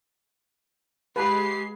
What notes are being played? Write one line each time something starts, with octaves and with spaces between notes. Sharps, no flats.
G#3 G4 B4 F5 A5 B5 C7